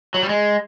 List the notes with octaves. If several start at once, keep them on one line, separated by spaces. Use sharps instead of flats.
F#3
G3
G#3